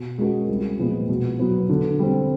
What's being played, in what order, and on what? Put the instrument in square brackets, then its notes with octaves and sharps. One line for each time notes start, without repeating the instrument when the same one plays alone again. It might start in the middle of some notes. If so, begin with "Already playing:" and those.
Already playing: [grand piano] B2
G#3 C#4 F#4 A#4
C2
A#2 F3 G#3 B3
B2
F#3 B3
D3
G3 C4